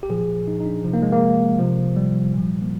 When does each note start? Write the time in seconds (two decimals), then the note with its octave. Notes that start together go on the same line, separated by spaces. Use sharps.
0.03 G4
0.09 A#2 F3 G#4
0.48 D#4
0.60 D#4
0.66 D4
0.84 C3 F3
0.94 A#3
1.02 G#3
1.12 A#3
1.59 C3 F3
1.96 G3
2.33 A#2 F3
2.62 A#3